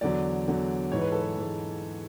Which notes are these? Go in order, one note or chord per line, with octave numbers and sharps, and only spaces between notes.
E2 D3 F#3 D5
E2 D3 F#3
G#2 E3 C#5
B4
A4
B4
G#2 E3